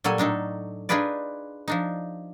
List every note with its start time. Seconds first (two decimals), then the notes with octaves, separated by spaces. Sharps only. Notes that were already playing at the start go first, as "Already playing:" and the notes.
0.04 A#2 F#3 G3 A4 G#5
0.18 A2 D4 D#4 A4
0.89 D4 D#4 F4 G#4 B4 D5
1.68 F3 D4 D#4